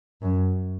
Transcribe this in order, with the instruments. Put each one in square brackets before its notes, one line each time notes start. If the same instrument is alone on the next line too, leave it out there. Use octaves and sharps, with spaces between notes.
[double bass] F#2